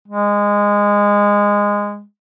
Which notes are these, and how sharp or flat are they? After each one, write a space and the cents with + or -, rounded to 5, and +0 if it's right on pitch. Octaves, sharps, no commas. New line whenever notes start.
G#3 -20